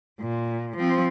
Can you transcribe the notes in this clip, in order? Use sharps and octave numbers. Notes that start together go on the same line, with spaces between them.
A#2
F3 C4